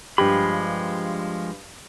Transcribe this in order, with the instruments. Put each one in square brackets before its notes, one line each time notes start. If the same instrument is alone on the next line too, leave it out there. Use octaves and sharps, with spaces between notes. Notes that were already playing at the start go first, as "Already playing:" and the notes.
[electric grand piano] G2 G4 [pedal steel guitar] F3 G#3 B5